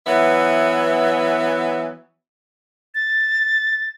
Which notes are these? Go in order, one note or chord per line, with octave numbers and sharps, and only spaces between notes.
E3 F#3 B3 E5
A6